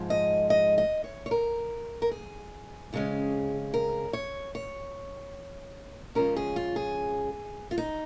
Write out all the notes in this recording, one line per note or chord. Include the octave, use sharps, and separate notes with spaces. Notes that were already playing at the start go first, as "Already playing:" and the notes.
Already playing: G#2 F3 G#3
D#5
D#5
D#5
C#5
C#5
A#4
A#4
G#4
F2 C#3 G#3 C#4
A#4
C#5
C#5
C#3 F3 G#3 C#4 A#4
G#4
F4
G#4
F4
D#4